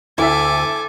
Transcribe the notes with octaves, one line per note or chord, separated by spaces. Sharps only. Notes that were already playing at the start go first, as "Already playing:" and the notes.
D2 E4 A4 E5 G#5 D6